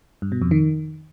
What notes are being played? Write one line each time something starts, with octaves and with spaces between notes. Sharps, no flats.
G2
B2
F2
D#3